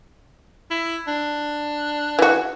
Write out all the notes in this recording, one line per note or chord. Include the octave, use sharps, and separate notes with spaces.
E4
D4
E3 F#4